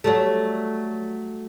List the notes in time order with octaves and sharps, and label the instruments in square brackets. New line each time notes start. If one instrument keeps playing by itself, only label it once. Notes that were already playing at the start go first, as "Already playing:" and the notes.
[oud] F#3 G3 A3